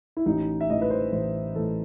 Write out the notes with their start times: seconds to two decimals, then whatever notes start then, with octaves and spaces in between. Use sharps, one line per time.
0.17 E4
0.26 A1 D#4
0.61 E5
0.70 A2 E3 D#5
0.82 B4
0.90 C5
1.12 A1 C5
1.55 A2 E3 A4